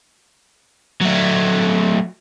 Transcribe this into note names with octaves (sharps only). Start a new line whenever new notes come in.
F#3 A3